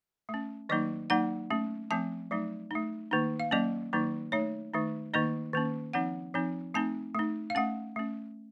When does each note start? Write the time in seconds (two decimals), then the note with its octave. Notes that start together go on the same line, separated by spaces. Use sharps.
0.29 A3
0.34 C#4
0.69 D#3 F#3 A#3 D#4 D#5
1.10 F#3 A#3 D#4 F#5
1.50 A3 C#4
1.90 F3 A3 C4 A5
2.31 F#3 A3 D#4
2.71 A3 D#4
3.11 D#3 A#3 D#4
3.40 F5
3.51 F#3 A#3 C#4 D#5
3.93 D#3 F#3 A#3 D#4
4.32 A3 D#4 C#5
4.74 D#3 A3 D#4
5.14 D#3 A#3 D#4 D#5
5.53 D#3 A#3 C#4
5.93 F3 C4 D#4 F#5
6.34 F3 C4 D#4
6.74 A3 C4 D#4 A5
7.15 A3 D#4
7.50 F5
7.55 A3 C#4 F#5
7.96 A3 C#4